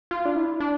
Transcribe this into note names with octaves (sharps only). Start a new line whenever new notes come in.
F4
D4
E4
D4